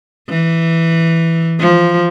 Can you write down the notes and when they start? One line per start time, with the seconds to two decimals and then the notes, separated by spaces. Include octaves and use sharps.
0.29 E3
1.60 F3